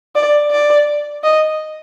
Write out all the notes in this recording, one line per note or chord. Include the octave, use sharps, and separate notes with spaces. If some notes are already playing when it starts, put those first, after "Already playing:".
D5
D5
D#5